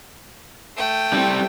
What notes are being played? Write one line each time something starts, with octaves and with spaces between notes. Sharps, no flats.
A3 G5
G3 C4